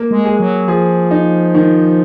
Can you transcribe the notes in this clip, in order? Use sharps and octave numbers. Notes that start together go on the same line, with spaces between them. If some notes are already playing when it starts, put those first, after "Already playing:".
Already playing: A#3
G#3
G#4
F#3
F3 G#4
D#4
D#3